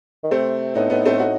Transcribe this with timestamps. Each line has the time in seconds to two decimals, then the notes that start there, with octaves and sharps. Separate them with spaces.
0.24 D#3
0.31 C3 A3 C4
0.75 A2 B3 D#4
0.90 A2 B3 D#4
1.05 A2 A3 C4
1.19 D#4 F#4